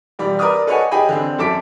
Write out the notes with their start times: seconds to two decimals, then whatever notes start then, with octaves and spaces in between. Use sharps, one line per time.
0.19 E1 G3 D5 B5
0.39 A#4 B4 D5 D6 D#6 F6
0.67 A4 B4 C#5 D#5 F#5 G#5
0.91 G4 G#4 D#5 G5 G#5 B5
1.09 D3 C4
1.38 F#2 A4 A5 D6 B6 D7